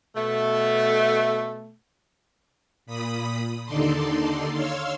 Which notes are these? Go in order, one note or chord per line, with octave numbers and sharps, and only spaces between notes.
B2 A3
A#2 B5 D#6
D#2 D3 D#4 A4 D5 C6
C#5 F5 C6 E6 F6